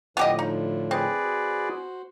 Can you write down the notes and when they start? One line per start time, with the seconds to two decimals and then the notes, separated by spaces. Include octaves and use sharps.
0.17 A2 D3 F3 B3 G4 D#5
0.39 D#4
0.91 C4 G#4 B4 D5
1.23 F#4 C5